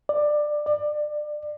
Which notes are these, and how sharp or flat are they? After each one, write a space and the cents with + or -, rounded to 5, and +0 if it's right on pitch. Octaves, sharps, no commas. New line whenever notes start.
D5 +20
D5 +30